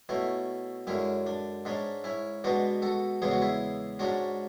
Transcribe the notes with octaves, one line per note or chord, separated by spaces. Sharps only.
B2 A3 C#4 E4
F#2 D3 G#3 C#4 E4
D4
G#2 G#3 C#4 D4
C#4 E4
B2 G#3 B3 D4 F#4
F#4 A4
E2 C#3 G#3 B3 G#4
F#4
E4 G#4
G#2 G#3 C#4 D4 F#4